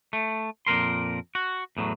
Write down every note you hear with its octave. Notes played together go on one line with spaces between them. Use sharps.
A3
F2 A#2 A#4 C6
F#4
E2 A2 D#3 F#3